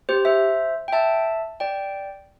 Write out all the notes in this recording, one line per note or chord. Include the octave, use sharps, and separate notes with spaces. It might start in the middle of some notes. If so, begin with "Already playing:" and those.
G4 C5
C5 E5
G5
E5 A5
D5 G5